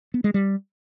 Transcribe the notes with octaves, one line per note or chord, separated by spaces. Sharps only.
B3
G#3
G3